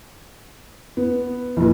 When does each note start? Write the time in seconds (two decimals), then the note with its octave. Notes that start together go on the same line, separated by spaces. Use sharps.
0.97 B3
1.57 F1 A#2